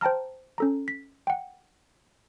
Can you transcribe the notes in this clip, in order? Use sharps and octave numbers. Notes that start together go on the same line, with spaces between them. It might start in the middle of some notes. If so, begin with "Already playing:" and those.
C5 G5 A5 A#5 F6
C#4 A4 A#5
B6
F#5 G5